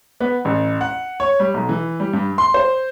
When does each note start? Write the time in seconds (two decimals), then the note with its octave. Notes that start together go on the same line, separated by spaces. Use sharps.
0.21 B3
0.45 A1
0.81 F#5
1.20 C#5
1.40 G3
1.54 B1
1.69 E3
2.00 G3
2.13 G2
2.38 C6
2.54 C5